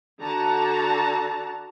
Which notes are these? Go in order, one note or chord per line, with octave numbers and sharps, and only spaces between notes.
D3 F#4 A5 A#5